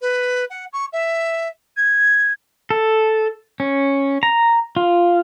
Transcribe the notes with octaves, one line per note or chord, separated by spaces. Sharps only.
B4
F#5
C#6
E5
G#6
A4
C#4
A#5
F4